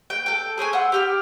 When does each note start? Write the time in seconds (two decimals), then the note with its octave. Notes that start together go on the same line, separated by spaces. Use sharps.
0.10 G5
0.26 A4 G5
0.58 G#4 C5 C#5 G#5
0.73 F#5 C6 E6
0.92 G4 G5 F6